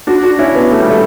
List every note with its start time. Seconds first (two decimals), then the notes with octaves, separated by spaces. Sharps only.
0.07 D4 F#4
0.23 D4 F#4
0.39 C#4 E4
0.55 B3 D4
0.71 A3
0.80 G3
0.91 A3